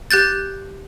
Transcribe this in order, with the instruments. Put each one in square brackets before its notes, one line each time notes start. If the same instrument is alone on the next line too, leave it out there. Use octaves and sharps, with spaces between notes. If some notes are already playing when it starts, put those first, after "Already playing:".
[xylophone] G4 F#6 G6 A6